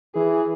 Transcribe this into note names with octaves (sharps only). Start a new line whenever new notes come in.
E3 G#4